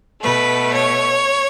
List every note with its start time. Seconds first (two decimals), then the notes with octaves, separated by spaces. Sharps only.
0.22 B2 A3 B4
0.74 C#5